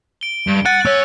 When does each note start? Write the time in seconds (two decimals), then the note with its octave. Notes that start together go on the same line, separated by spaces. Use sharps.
0.21 D7 G7
0.47 G2
0.66 F#5 F#6 A6 D#7
0.85 C#4 C#5 E6